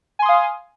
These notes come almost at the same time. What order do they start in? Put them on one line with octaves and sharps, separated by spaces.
G#5 C6 D#6 F5